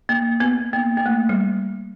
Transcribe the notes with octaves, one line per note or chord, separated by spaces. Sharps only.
A#3
B3
A#3
A#3
A3
G3